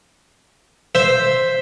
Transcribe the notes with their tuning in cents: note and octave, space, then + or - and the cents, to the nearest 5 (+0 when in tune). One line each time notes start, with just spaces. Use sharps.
C5 +0 E5 +0